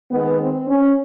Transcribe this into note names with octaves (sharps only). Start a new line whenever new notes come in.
D#3 G#3 B3
C4
C#4